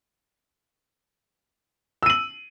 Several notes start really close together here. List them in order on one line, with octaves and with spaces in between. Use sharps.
E6 D#7 F#7